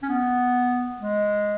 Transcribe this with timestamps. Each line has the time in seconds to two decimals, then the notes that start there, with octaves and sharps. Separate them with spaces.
0.03 C#4
0.09 B3
0.99 G#3